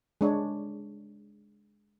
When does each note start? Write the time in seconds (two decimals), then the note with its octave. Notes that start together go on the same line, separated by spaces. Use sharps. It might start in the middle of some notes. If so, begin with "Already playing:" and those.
0.21 G#3 D4 C#5